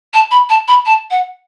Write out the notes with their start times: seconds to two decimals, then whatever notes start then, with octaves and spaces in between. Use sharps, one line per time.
0.13 A5
0.31 B5
0.49 A5
0.68 B5
0.85 A5
1.10 F#5